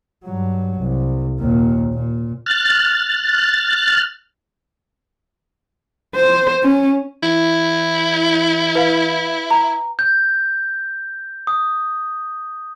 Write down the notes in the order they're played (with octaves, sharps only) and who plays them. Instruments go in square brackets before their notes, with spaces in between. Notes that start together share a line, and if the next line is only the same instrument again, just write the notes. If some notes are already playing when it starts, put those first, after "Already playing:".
[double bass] G2 F#3
C2
D#2 A#2
A#2
[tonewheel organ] F6 F#6 A6
[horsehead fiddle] C5
C#4
[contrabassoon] E3 [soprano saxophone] E4
[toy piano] B4 F5
A#5
[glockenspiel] G6
D#6